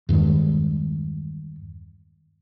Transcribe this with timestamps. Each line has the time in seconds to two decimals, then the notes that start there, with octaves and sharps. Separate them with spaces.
0.09 E2 G2 D#3 G#3